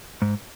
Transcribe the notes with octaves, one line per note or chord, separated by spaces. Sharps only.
G#2